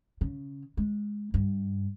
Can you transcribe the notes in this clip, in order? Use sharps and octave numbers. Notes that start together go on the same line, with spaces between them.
C#3
G#3
G2